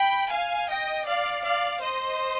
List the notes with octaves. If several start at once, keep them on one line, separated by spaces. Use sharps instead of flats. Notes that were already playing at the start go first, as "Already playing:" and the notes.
Already playing: G5 B5
F5 G#5
D#5 G5
D5 F5
D5 F5
C5 D#5